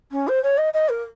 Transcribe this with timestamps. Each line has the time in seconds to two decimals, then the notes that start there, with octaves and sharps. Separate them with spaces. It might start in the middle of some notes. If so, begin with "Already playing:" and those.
0.12 C#4
0.28 C5
0.43 C#5
0.58 D#5
0.74 D#5
0.89 A#4